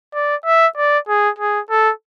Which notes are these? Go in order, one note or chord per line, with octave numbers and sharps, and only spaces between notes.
D5
E5
D5
G#4
G#4
A4